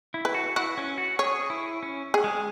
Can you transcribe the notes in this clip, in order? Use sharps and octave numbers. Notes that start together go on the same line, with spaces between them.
E4
B4
F#4
E4 F#4
C#4
F#4
G#4 C#5
E4
C#4
G#4
G#3